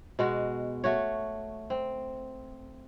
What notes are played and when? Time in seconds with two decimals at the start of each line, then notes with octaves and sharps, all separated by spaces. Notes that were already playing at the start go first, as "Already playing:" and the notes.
0.19 B2 G#3 F#4
0.84 A3 F#4 C#5
1.70 C4